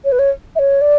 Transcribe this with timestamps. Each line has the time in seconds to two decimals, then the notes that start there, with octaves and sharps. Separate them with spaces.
0.04 C#5
0.12 B4
0.19 C#5
0.55 E5
0.59 C#5
0.81 D5